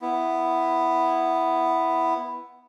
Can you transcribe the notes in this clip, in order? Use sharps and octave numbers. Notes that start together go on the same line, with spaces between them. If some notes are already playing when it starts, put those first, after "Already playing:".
B3 E4